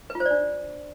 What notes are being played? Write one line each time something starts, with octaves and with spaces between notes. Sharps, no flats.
B4
F4
C5
D5
D4